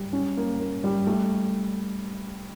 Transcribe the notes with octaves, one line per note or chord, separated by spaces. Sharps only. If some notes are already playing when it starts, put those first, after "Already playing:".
Already playing: G3
C#4
A#3
A#3
G3
A3